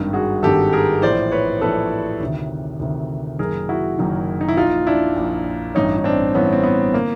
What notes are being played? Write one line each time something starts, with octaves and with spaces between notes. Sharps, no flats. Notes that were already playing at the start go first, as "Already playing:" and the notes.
Already playing: G#1 G2 D#3
F#4 G#4
G#1 G2 D#3 G4 A4
G#4 A#4
A#1 A2 E3 C5 D5
B4 C#5
A#1 A2 E3 A4 B4
D2 C3 D#3
D2 C3 D#3
F#1 F#2 D#3 G#4 A#4
E4 F#4
F#1 F#2 D#3
D#4
E4
A#1 A#2 D#4 F4
D4 E4
A#1 A#2
A1 G2 E3 C#4 D#4
D#4
C4 D4
A1 G2 E3 B3 C#4
C4
B3
D3 A#3